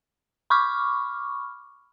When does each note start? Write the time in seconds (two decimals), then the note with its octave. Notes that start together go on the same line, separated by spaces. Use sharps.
0.50 B5 C#6 D6 F6